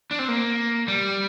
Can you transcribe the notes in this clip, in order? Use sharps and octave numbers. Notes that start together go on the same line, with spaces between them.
D4
C4
A#3
G3